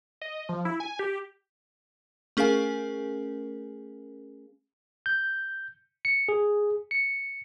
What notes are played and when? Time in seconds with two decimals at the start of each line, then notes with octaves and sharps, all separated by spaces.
0.21 D#5
0.49 F3
0.65 E4
0.80 G#5
0.99 G4
2.37 A3 C#4 G#4 A#4 F5 G#5
5.06 G6
6.05 C#7
6.29 G#4
6.91 C#7